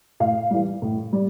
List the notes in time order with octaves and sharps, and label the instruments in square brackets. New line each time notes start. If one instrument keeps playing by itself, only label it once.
[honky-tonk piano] A2 F5
E3 G3
A2
G3